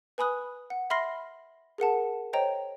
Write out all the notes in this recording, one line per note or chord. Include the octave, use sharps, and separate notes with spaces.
B4 G#5 B5 D#6 F#6
F#5
E5 B5 C6 F6 A#6 C7
G#4 A#4 F#5 A5
C5 C#5 D#5 G5 A#5